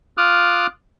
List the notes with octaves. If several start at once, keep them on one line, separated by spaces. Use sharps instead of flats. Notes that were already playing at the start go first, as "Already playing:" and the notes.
F4 D6 D#6 F6 F#6